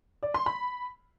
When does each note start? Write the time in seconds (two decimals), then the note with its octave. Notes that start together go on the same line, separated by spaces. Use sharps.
0.23 D5
0.34 C6
0.46 B5